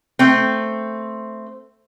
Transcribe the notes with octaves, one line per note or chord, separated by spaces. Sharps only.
A3 C4